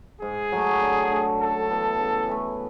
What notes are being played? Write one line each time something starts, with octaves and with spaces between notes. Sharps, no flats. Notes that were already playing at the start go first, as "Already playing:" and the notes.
G#2 G#4
F#3 A3
D3
A3 D4
C#3 A4
E3 B3 E4
C#3
E3 A3